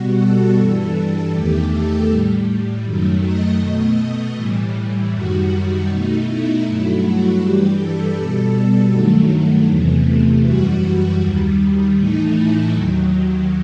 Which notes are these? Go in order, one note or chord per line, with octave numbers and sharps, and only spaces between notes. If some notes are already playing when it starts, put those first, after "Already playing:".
Already playing: B2 G3 F#4
A4
G2 E3 G3 A4
E2 D#3 A3 G4
A4
A2 G3
F#2 D#3 F#3 A3
D#5
B2 A3 D#5
A2 E3 G3
F#2 D#3 G3 F#4
F#4
B2 A3 D#4
E4
G2 F#3 A3 E4
F#4
G2 E3 G3 G4
A4
B2 G3 A4
G2 D#3 F#3 A3
E2 C3 E3 A3
F#2 E3 G3 F#4
D#2 D#3 G3
A2 E3 A3 D#4
E4
D#2 D#3 F#3